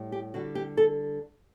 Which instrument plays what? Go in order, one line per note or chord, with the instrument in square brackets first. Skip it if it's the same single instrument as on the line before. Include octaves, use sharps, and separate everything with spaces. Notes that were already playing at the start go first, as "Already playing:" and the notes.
Already playing: [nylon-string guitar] A2 G3
G4
D3 G3 F#4
G4
A4